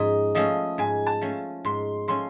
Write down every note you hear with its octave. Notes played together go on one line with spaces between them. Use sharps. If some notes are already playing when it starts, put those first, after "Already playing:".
Already playing: G#2 F3 C#4 D#5
F3 A3 C#4 D#5
G#2 G#5
A5
F3 A3 C#4
G#2 C6
F3 A3 C#4 C6